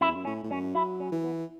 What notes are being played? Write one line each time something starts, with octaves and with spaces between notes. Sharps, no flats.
F#2 E4
E2
F#2
A2 C#4
A2
F#2 C#4
F#3 E4
C#4
E3
B3